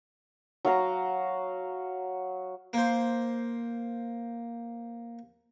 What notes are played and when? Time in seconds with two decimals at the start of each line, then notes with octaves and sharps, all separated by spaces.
0.65 F#3 F5 A#5
2.73 A#3 C5